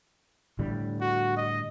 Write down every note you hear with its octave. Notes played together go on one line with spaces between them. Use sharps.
A2 D3 G3
F#4
D#5